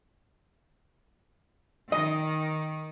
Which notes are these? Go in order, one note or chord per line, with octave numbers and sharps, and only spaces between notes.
D#3 D#5